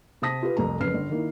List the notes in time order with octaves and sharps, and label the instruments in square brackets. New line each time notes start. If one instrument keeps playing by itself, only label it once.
[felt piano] C3 C4 A5 D#6 A#6 B6
F4 G4 B4
C2 F2 A3 A#5
F#1 F2 B4 F6 C7
G1
D#3 A#3 E4